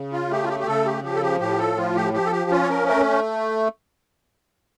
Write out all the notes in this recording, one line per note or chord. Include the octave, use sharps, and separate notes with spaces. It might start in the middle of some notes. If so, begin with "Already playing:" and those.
Already playing: C#3
F4
A3 G4
F4
G4
G4
C#3 A4
G4
F3 G4
A4
G4
A2 G4
A4
F3 F4
G4
F3 G4
A4
G4
C#4 F4
C#5
A#4
A3 A#4